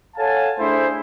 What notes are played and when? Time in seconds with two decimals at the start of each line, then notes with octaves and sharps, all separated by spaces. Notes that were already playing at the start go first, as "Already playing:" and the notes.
0.16 A4 C#5 F5 F#5 G#5 A5
0.58 A3 D4 E4 G#4 C5